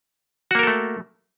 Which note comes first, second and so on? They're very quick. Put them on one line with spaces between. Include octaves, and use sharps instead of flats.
F#4 A#3 A#4 A4 A3